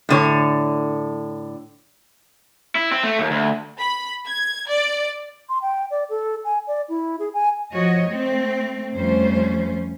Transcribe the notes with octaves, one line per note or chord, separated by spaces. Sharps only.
A2 D3 C#5
E4
C4
A3
D#2
D2
B5
G#6
D5
C6
G5
D5
A4
G#5
D5
E4
G#4
G#5
F3 F#4 C#5 D#5
A3 C4
F2 G3 A3 C#4 C5